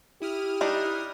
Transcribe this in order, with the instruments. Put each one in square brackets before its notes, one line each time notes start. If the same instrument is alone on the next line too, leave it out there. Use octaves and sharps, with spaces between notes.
[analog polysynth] E4 D#6 F6 [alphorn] G4
[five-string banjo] G3 D4 D#4